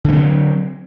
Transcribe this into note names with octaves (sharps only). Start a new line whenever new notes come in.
D3 F#3 A3 C4